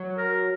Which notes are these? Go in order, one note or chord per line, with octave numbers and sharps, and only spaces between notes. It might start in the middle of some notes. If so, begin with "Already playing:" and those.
Already playing: F#3
A#4